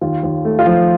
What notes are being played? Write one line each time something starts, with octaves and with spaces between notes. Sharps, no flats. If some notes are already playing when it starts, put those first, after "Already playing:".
D#2 F4
D#2
A3
F4
F3